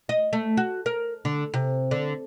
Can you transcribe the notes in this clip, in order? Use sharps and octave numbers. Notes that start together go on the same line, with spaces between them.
D#5
A3
F#4
A#4
D3
C3
D3